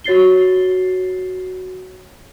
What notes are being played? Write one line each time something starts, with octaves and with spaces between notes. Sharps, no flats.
F#4 C#5 A6 C7 G7